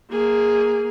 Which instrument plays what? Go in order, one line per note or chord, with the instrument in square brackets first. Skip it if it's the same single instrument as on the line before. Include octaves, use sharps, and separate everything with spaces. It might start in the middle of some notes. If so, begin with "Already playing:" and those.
[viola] A#3 G#4